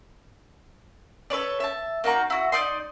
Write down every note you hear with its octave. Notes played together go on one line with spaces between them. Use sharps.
A4 B4 C#5 D5
E5 A5
A#3 D#4 F#4 A#5
E4 F#4
D#4 D5 D#5 C6